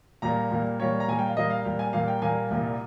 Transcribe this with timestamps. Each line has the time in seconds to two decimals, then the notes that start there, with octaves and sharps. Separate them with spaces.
0.22 A#2 G3 A#3 A#5
0.51 A#2 G3 A#3
0.80 A#2 G3 A#3 C#5
1.00 A#5
1.08 A#2 G3 A#3 G#5
1.19 G5
1.27 F5
1.37 A#2 G3 A#3 D#5
1.50 F5
1.65 A#2 G3 A#3
1.79 G#5
1.93 A#2 G3 A#3 F5
2.08 G5
2.22 A#2 G3 A#3 G#5
2.50 C2 A#2 G3 A#3